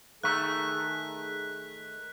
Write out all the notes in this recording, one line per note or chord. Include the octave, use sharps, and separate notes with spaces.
D#3 A3 G#4 F#6 B6